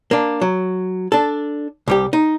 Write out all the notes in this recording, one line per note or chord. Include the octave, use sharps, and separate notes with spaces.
A#3 D4
F#3
D4 A4
C2 G3 G4
D#4